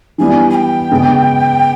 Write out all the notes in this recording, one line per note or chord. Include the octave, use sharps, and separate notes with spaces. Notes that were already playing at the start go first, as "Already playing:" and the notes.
E3 G3 B3 G#5
G#5
G5
C#3 G#3 B3